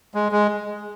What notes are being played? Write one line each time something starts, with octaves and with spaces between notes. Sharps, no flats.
G#3
G#3